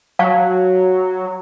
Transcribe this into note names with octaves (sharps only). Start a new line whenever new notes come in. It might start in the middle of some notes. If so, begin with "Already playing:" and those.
F#3 F5 A5 C#6